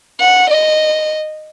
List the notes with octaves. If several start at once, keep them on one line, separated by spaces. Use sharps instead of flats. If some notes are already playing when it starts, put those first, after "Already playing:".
F#5
D#5